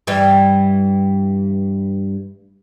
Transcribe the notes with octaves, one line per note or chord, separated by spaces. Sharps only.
G2 E3 G3